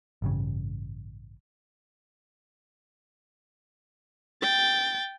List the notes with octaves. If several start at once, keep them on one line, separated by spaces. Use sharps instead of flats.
A1 G2 C#3
G5 A6